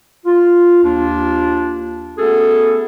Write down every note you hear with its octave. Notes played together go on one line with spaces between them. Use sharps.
F4
D#2 A#3 D4 F4
A3 B3 C#4 F#4 G#4 A4